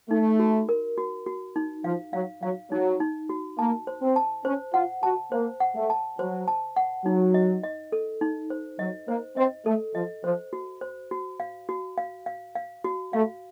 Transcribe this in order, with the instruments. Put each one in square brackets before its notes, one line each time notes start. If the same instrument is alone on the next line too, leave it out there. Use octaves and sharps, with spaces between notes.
[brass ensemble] A3 [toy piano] D#4
[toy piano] F#4
A#4
F#4
F#4
D#4
[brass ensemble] F3 [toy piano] F5
[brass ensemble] F#3 [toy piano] F5
[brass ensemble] F#3 [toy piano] F5
[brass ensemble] F#3 [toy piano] D#4
[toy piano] D#4
F#4
[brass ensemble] A#3 [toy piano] A5
[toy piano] C5
[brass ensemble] C4
[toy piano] A5
[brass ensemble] C#4 [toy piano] C5
[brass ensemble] F4 [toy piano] F#5
[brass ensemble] F#4 [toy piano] A5
[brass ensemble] A#3 [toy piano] C5
[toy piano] F#5
[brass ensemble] A3
[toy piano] A5
[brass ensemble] F#3 [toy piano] C5
[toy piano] A5
F#5
[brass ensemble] F#3 [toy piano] D#4
[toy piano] D#5
D#5
A4
D#4
C5
[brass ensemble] F#3 [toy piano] D#5
[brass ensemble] A#3 [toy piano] C5
[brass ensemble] C4 [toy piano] D#5
[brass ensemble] A3 [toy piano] A4
[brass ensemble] F3 [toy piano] D#5
[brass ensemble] F3 [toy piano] C5
[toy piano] F#4
C5
F#4
F5
F#4
F5
F5
F5
F#4
[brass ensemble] A3 [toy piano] F5